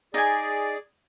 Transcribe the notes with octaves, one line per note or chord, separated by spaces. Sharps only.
D#4 G#4 D5 G#5